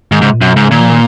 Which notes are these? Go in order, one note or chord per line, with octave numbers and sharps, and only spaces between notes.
G#2 D#3
G#2 C#3
A#2
F#2 B2
G#2 C#3
A#2 D#3
F3
D#3